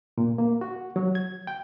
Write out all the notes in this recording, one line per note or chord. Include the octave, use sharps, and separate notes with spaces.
A#2
A#3
F#4
F#3
G#6
G5